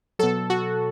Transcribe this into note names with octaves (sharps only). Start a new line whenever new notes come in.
B2 F#3 A4
F#4